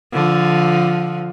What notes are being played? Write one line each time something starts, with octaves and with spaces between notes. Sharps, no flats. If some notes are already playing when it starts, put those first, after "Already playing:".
D3 F3